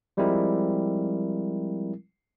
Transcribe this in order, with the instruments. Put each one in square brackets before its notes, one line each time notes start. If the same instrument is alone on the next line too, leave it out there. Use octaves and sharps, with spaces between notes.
[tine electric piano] F3 G3 G#3 C4 E4 A#4